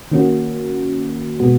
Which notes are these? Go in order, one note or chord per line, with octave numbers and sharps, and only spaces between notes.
D#3 A#3 C#4 F#4
B2 G#3 B3 F#4